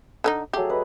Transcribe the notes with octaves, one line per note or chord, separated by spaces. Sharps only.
D3 C#4 D#4
F#3 A3 G4 G#4
B4 D#5